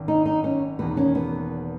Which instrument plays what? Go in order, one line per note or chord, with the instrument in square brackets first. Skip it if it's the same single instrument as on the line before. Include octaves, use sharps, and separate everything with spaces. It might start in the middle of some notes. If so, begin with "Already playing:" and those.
Already playing: [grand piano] G#1 F#2 D#3
[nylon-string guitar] D#4
D#4
C#4
[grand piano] E1 E2 D#3 A#3 [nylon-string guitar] B3
[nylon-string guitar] C#4
B3